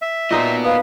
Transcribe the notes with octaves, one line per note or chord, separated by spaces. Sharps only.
E5
A#2 B3 D#4 C5 D#5
B4 F5 D#6